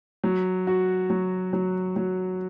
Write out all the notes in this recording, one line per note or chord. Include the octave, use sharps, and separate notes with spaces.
F#3
F#4
F#3
F#3
F#3